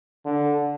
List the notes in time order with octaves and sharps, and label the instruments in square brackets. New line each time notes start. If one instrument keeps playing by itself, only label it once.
[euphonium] D3